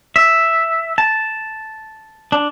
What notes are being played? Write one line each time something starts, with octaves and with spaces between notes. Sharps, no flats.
E5
A5
D4